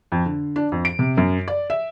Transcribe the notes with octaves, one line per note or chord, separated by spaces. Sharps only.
F2
D3
D4
F2
D7
C3
F#2
D5
E5